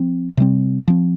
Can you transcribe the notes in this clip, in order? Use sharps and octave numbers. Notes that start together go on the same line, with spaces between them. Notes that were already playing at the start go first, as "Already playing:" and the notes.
Already playing: F3 C4
C3 G3 C4
F3 C4